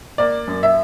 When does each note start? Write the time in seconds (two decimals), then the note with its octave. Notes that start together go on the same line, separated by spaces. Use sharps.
0.18 A#3 D5
0.48 F#2
0.63 E5